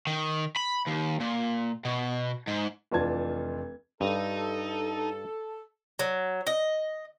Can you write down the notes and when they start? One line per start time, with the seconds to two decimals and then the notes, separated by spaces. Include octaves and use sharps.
0.07 D#3
0.56 B5
0.87 D#2
1.20 A#2
1.85 B2
2.47 G#2
2.91 F1 E3 D4 F4 A5 G#6
4.01 G2 D#4 A4
5.99 F#3
6.47 D#5